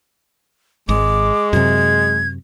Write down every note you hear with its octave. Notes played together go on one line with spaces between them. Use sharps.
G#1 G#3 D6
F#2 C3 G#6